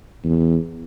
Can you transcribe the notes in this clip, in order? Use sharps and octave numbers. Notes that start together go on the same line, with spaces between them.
E2